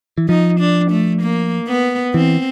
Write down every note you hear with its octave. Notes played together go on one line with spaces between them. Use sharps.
E3
F3 D#4
D4
A3
A#3
B3
E3 C4